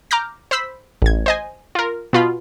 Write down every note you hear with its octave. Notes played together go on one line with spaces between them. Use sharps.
A#5 D6 F6 G6 A#6
C5 B5 E6 B6
A1 G#6
C5 D#5 G#5
F4 A#4
B2 F4 B5